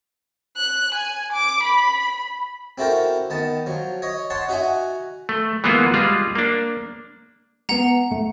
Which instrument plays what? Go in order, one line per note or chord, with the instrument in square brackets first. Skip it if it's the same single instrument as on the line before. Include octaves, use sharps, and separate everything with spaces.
[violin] F#6
G#5
D6
B5
[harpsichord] C4 E4 F#4 A4 A#4 G5
D#3 B3 A5
F3 F#3
C#5 D#5
C#5 F#5 A5 C6 C#6
D#4 F#4 E5 F#5 G#5
[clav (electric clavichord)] A3
E3 G#3 A#3 B3 F4 F#4
G3 G#3 F4 G#4
A#3 D4
[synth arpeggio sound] G#3 B3 [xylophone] F#5 A#5
[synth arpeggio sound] G#2 A3 C#7